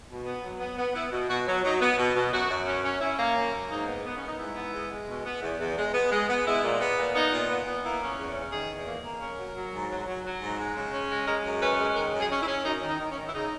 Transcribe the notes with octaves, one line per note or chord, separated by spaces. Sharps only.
B2
B3
F#3
B3
B3
B3 E4
B2
B2 F#4
F#3
F#3 D#4
B3
B2
B2
F#2 F#4
F#2
C#4
C#4
C#4 E4
A#3
F#2
A#3
G#2 D#4
B3
B3
C#4
B3
D#4
G#2 E4
B3
G#3
G#3
B2
B3
E2
E2
G#3
B3
G#3
B3
G#3 E4
A#2
B3
A#2
B3 D#4
A#2
B3
B3
A#3 E4
C#4
E2
C#4
D#3 G#4
E2
A#3
A#3
C#4 A#4
F#3
F#3
G#2
F#3
F#3
F#3
G#2
G#3
C#3
C#4
G#3
G#3 A#4
F#2
C#4 B4
G#3
D#3 A#4
F#2
G#4
C#4
E4
C#4
F#2 D#4
D#3
D#4
D#3
C#4
D#3
E4
C#3 D#4